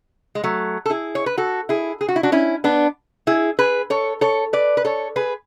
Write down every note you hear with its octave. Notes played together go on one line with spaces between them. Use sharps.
G#3
F#3 A3
A4
E4 G#4
C#5
B4
F#4 A4
E4 G#4
G#4
F#4
E4
D4 F#4
C#4 E4
B3 D4
E4 G#4
G#4 B4
A4 C#5
A4 C#5
B4 D5
B4
A4 C#5
G#4 B4